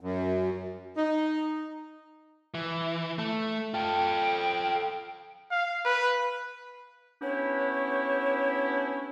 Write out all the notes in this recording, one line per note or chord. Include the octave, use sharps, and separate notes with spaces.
F#2
D#4
E3
A3
F4 A4 G5
F5
B4
B3 C#4 D4 E4 G4 C#5